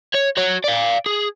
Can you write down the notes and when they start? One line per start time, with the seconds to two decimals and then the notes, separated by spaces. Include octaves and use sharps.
0.14 C#5
0.37 F#4 C#5
0.64 D5 F5
1.06 G#4